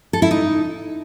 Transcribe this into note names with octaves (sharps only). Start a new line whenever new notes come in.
A4
E4
D#4